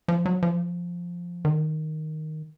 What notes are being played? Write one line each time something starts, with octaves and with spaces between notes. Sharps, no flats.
F3
F#3
F3
D#3